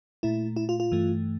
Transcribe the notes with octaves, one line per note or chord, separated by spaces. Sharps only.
A#2 A3 E4
E4
F4
F4
G2 E3 A3